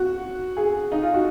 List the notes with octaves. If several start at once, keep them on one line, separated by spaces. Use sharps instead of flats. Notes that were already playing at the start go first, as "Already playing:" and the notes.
Already playing: F#4
G#4
D#4
F4
F#4